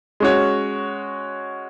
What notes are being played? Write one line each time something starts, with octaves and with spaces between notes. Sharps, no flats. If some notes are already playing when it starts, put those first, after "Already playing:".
G#3 C#4 F#4 C#5